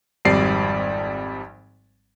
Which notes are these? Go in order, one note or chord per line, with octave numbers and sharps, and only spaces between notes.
G#1 F2 G3 D5 C7